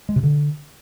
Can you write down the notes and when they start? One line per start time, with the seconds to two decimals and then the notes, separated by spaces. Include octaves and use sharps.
0.09 G#3
0.16 C3
0.23 D3